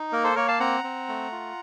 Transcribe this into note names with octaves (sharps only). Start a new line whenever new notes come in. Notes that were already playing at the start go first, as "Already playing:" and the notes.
Already playing: D#4
A#3 A#4
A4 C5
A#3 A#4 C#5
F5 A5
C4 F#5 A#5
C4
A3
F4